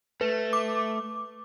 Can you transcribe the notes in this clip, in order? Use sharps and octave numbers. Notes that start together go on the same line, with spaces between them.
A3 B4
D6